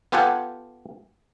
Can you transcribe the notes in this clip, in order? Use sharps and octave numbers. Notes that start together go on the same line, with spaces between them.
B3 F4 G4 A4 F#5 G#5